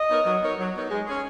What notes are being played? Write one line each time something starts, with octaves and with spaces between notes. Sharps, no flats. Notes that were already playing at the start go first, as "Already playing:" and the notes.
Already playing: D#5
B3 D#4 A#4 C#5
F#3
B3 D#4 A#4 C#5
F#3
B3 D#4 A#4 C#5
G#3
C#4 G#4